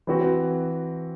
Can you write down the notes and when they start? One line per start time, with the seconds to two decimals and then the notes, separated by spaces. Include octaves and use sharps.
0.07 E3 C4 F#4